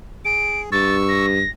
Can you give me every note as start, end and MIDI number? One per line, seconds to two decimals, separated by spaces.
0.25 0.70 68
0.25 0.61 98
0.72 1.42 43
0.72 1.26 85
0.72 1.26 88
0.72 0.95 93
1.09 1.50 94